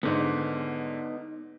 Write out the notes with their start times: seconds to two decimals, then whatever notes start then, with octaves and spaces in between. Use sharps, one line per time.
0.03 G#2 D3 B3 D#4 D5